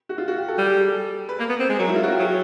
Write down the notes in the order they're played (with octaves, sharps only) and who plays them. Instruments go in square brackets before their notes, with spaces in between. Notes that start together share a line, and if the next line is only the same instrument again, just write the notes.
[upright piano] F#4
F4
F#4
G4
A4
[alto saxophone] G3
[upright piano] G#4
G#4
A4
B4
[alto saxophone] A#3 [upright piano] A#4
[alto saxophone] B3
C4
G#3
[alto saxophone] F#3 [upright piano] A#4
[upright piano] E4
F4
F#4
G4
[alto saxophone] F#3 [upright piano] G#4